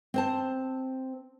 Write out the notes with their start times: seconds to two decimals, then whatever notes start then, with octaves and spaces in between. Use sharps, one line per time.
0.14 C4 C5 A5